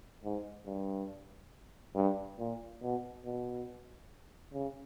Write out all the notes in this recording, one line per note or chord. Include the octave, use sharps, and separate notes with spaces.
G#2
G2
G2
A#2
B2
B2
C#3